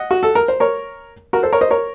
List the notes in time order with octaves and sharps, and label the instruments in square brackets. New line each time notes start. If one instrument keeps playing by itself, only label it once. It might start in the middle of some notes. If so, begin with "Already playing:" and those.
Already playing: [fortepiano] D#5 F#5
F#4
A4
A#4
C5
A#4 C#5
F#4 A#4
A4 C5
A#4 C#5
C5 D#5
A#4 C#5